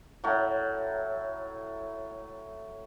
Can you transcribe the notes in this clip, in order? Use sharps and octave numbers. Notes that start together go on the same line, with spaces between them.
A2 F#3